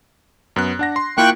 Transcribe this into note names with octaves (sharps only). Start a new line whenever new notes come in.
F#2 B3 F#6
D4 F#5 A#6
C6
A#3 E4 F4 G5 C#6 F#6